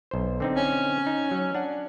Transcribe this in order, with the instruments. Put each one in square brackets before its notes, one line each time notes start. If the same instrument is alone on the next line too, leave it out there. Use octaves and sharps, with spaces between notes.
[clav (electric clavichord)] B1 C5
D3 C4 D#4
[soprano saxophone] C#4
[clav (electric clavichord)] D#4
F#3
D4 F#5